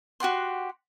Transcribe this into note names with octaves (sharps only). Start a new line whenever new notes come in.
F#4 G4 F#5 C6